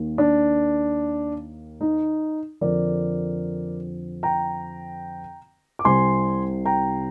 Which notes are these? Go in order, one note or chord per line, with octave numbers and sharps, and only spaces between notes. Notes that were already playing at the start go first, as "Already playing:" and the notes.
Already playing: D#2 D#3 A#3
D4
D#4
F2 D3 F3 C4 A#4 D5
G5 A#5
D6
C2 C3 G3 C4 G#5 C6
G5 A#5